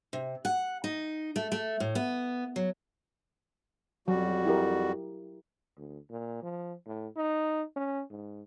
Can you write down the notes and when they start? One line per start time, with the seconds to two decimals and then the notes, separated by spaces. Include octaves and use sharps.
0.13 C3
0.45 F#5
0.84 D#4
1.36 A3
1.52 A3
1.80 A2
1.95 B3
2.56 F#3
4.08 F2 F#3 G3 F#4
4.46 E4 G4 A#4
5.77 D2
6.10 A#2
6.42 F3
6.86 A2
7.16 D#4
7.76 C#4
8.10 G#2